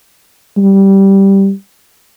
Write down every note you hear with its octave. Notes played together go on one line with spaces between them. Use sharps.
G3